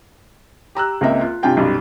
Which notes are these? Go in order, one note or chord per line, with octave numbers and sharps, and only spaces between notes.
G4 A#5 E6 F#6
C#2 A#3 C4 A#4 D#5 E5
F4
G2 C3 F4 G5 G#5
B1 F#2 G3